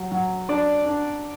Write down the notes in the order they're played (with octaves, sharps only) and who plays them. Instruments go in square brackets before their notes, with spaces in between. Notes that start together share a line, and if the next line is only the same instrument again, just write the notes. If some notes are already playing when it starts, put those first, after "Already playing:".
Already playing: [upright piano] F#3
F#3
[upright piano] D4 [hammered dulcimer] D5
[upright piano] D4